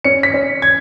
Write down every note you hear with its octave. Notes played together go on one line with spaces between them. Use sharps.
C#4 C#7
B6
C#4
G#6